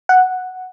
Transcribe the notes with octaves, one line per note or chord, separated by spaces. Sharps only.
F#5